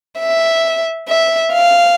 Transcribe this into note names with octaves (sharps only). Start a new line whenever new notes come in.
E5
E5
F5